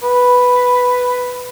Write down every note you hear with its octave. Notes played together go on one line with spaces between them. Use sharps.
B4